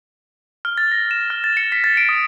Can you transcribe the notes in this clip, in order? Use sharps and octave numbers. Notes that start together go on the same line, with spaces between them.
F6
A6
A#6
E7
F6
A6
C#7
B6
A6
D7
D#6